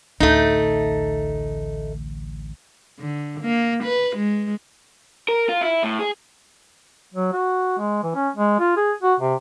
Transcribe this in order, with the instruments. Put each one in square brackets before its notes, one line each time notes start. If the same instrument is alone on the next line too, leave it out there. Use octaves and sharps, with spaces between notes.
[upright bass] A1 D2 [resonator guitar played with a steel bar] A3 D#4
[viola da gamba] D3
A#3
B4
G#3
[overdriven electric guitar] A#4
F4
E4
A2
G#4
[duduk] F#3
F#4
G#3
E3
C#4
G#3
F4
G#4
F#4
C3